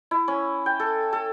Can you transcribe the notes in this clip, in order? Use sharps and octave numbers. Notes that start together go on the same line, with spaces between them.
E4
C#4
G5
A4
A4